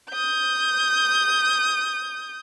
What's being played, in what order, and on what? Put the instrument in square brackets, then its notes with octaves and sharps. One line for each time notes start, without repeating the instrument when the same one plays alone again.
[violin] D#6 G6